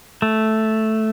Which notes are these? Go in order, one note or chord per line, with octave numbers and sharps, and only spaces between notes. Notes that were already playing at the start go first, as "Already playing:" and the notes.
A3